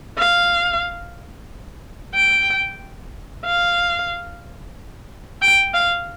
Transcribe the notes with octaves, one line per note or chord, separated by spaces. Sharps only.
F5
G5
F5
G5
F5